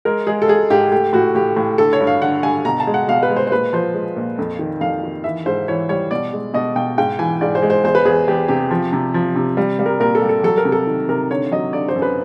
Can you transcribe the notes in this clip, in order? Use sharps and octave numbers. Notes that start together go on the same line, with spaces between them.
G#3 A#4
G#3 G#4
A4
G#3 G#4
G#2 G4
A3 G4
A2 F#4
A2 G4
A2
D3 A4
C#5
G2
F5
D3 F#5
G2 G#5
B2 A#5
A5
G#3
F#5
B2 F5
B4
G#3
C5
C5
A#2 B4
F3 C5
G#3
A#2
F2
D#3
F2 F5
D#3
E3 E5
G#2 C5
E3 C#5
G3 C#5
B2 D5
G#3
B2 D#5
B2 G5
G#2 G5
E3 G#5
G#2 D5
C5
G#3
C5
E2 C5
B4
E2 G#4
E2 G4
C3 G4
F3
C3
F3
C3
G3
G3
A#4
A#2 A#4
A4
G3
A4
F#3 A4
A#4
C3
A4
D#3
C3 A#4
D3 C#5
F#3 D#5
D3 D5
C5
F#2
B4